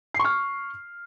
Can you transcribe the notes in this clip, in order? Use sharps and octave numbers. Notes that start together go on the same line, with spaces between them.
C#6 F6 C7